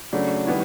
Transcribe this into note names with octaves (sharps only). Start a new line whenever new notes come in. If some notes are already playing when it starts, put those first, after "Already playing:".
C#3 F#3 A3 D4
D#3 G3 B3 E4